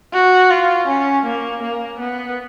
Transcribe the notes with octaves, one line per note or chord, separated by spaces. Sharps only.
F#4
F4
C#4
A#3
A#3
B3